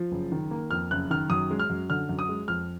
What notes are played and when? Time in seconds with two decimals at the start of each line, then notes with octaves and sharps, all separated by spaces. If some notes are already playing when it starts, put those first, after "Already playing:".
Already playing: F3
0.12 F#1
0.32 D#3
0.51 A#3
0.71 F2 F6
0.91 F#1 F#6
1.10 D#3 F6
1.30 F#2 D#6
1.51 G#3
1.59 F6
1.70 F#2
1.90 D3 F6
2.09 F#2
2.19 D#6
2.29 G#3
2.48 F2 F6